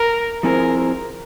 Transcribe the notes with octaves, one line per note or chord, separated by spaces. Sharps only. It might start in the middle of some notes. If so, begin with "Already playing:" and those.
Already playing: A#4
F3 C4 E4 G#4 A#4 C5
A#4